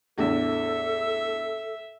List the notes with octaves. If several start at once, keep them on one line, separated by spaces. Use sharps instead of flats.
E2 A2 D3 A4 E5